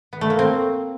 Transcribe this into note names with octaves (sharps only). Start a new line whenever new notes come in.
B3
A3
A#3
C4